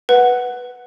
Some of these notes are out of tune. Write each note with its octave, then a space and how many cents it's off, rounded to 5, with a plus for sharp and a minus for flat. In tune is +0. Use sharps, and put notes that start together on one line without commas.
B4 +0 F#5 +0